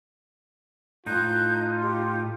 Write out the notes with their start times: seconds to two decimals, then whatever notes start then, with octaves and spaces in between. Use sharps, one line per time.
1.06 A2 D#4 F4 F#6 G6
1.82 G4